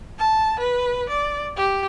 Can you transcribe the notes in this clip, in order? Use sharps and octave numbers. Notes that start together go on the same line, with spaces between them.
A5
B4
D5
G4